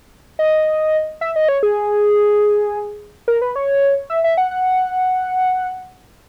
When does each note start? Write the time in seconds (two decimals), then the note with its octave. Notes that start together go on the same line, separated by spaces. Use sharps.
0.39 D#5
1.21 E5
1.36 D#5
1.49 C#5
1.63 G#4
3.28 A#4
3.42 B4
3.56 C#5
4.10 E5
4.24 E5
4.38 F#5
4.51 F#5